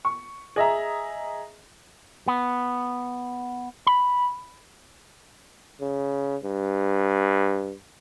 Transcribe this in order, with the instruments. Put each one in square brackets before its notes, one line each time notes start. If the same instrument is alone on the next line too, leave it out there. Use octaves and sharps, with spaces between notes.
[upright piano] C#6
G#4 D#5 E5 A#5
[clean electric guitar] B3
B5
[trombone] C#3
G2